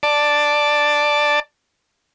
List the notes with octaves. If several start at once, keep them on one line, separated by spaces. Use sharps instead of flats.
D5 A5